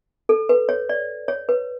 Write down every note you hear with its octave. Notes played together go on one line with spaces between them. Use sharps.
A4
B4
C#5
D5
C#5
B4